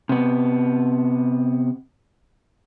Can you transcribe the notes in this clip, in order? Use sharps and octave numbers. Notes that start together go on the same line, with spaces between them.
C3 B3